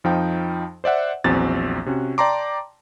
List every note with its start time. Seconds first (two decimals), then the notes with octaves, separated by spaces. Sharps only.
0.04 F2 F3 D#4 F5 G5
0.84 C5 D5 E5 F#5
1.24 A#1 E2 F#3 C4 A6
1.86 C3 C#4 F#4
2.18 D5 G5 A5 A#5 C6 D6